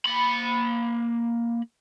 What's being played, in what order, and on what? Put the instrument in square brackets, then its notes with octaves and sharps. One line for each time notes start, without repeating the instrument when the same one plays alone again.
[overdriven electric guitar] A#3 B5